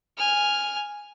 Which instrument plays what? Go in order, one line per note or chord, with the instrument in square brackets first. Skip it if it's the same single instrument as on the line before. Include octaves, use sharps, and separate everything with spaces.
[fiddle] G#5 F6